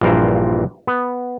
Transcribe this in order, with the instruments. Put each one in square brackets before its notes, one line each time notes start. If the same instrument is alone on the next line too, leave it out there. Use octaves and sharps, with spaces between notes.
[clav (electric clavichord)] A#1 G2 E3 F4 A#4 C5
B3